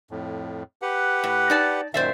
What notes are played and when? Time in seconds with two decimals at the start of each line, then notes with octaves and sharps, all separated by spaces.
0.11 F2 A2
0.82 G4 B4 F#5
1.23 A2
1.50 D#4 D5 A5
1.94 F#2 A#2 D#3 C5 D5 E5